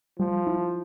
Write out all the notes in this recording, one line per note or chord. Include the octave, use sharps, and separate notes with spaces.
F3 G3
E4